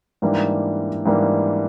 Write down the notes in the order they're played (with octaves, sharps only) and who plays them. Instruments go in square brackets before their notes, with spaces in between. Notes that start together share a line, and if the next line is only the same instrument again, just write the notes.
[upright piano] G#2 E3 G3 A#3 D4
G#2 E3 G3 A#3 D4